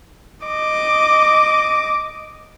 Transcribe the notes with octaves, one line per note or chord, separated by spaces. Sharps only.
D#5 D6